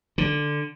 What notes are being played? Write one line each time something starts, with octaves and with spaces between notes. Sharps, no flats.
D3